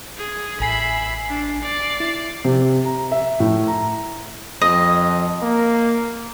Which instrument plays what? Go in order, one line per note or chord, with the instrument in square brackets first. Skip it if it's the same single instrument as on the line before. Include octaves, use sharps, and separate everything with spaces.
[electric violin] G#4
[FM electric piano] A1 G#5 C7 [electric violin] E5 B5
[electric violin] D4
D5 C7
[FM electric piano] E4
[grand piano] C3
A#5
E5
A2
A#5
[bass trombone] F2 [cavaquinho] D#5
[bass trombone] A#3